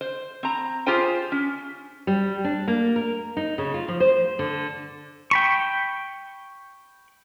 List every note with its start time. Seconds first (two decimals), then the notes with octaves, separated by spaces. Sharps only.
0.01 C5
0.43 C4 A#5
0.86 F4 G4 G#4 C5 G5
1.32 C#4
2.07 G3
2.44 D4
2.68 A#3
2.96 A#4
3.37 D#4
3.58 C#3
3.74 F4
3.88 F3
4.00 C5
4.39 D3
5.31 G5 B5 C#6